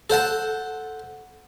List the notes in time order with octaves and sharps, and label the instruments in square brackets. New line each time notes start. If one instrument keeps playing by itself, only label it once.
[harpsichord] A4 C5 F#5 A5